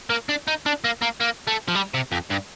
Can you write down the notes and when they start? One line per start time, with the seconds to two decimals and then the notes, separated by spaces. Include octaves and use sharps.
0.10 A#3
0.29 D4
0.48 D#4
0.66 D4
0.84 A#3
1.02 A#3
1.21 A#3
1.48 A3
1.68 F3
1.75 G3
1.94 C3
2.12 F2
2.30 G2